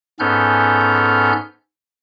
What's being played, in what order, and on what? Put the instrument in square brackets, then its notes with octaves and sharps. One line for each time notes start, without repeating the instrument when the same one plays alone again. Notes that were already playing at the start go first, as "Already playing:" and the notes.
[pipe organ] G#2 B3 C#4 A4 F6 G6